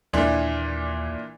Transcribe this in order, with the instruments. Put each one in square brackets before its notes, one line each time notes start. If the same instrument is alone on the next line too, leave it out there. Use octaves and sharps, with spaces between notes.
[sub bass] D#2 [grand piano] A#2 E3 D4